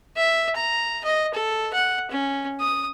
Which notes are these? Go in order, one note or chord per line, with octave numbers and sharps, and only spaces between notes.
E5
A#5
D#5
A4
F#5
C#4
D#6